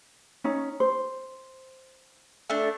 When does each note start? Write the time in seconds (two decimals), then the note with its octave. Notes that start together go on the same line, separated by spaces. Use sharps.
0.44 C#4 D#4
0.80 C5
2.50 A3 D4